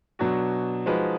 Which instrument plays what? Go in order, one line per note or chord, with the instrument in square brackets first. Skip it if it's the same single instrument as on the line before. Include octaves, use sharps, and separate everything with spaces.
[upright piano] B2 F#3 D4 F#4
F3 G#3 D#4 F#4 B4